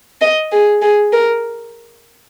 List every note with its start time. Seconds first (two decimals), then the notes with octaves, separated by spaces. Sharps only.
0.21 D#5
0.52 G#4
0.82 G#4
1.12 A#4